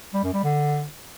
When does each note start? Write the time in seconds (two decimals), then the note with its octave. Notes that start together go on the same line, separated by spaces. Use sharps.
0.14 G3
0.23 F#2
0.33 G3
0.43 D3